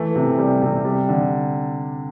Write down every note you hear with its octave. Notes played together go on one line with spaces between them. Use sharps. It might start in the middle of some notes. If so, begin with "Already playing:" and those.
Already playing: E3 A3
C3
G3
C3
G3
D3